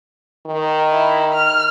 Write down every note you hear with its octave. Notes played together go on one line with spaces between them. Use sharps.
D#3
E4
F6